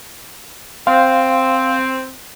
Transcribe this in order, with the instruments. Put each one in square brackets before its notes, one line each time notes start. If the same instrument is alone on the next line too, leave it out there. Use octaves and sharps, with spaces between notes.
[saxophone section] C4 [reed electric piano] F5 C6